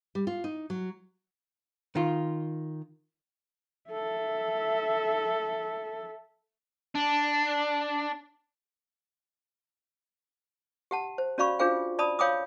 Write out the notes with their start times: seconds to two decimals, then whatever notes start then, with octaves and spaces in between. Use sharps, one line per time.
0.15 G3
0.27 F4
0.44 D#4
0.70 F#3
1.95 D#3 F4
3.90 A4 E5
6.95 D4
10.91 G4 F#5 A5
11.18 C5
11.38 C#4 F#4 D5 F5 B5 C#6
11.59 D4 F4 G#4 C5 F5 G5
11.99 D5 A5 B5 D#6
12.19 C#5 F5 G5 B5 D6 D#6